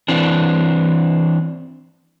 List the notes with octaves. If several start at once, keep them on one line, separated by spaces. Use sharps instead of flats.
E3 C4 D4